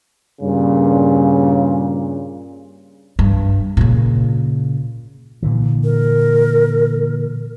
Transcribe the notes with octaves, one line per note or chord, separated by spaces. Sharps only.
G2 A#2 C#3
G2
A#2 C#3
A#2 D3 E3
A#4